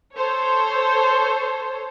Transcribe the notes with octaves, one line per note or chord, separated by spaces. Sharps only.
A4 C5 C#5